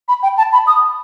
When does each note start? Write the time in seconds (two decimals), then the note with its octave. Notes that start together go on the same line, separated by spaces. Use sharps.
0.08 B5
0.23 G5
0.38 A5
0.53 B5
0.67 D#6